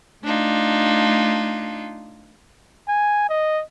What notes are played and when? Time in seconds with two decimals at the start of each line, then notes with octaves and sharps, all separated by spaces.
0.23 A3 D4 D#4 F4
2.89 G#5
3.29 D#5